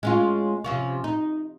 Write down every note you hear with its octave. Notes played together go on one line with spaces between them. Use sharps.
G#3 C#4 F4
C3 F3 C#4
D#4